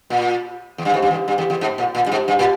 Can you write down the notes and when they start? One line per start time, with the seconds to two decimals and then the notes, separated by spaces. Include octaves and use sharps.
0.10 A#2
0.78 E2
0.85 G2
0.94 G#2
1.02 G2
1.11 E2
1.28 G2
1.38 E2
1.50 E2
1.61 G#2
1.78 A#2
1.95 A#2
2.06 G2
2.12 G#2
2.28 G2
2.39 A#2